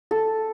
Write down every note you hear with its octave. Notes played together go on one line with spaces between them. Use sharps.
A4